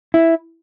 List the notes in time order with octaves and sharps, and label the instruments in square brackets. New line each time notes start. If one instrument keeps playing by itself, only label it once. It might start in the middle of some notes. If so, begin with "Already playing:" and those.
[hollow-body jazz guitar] E4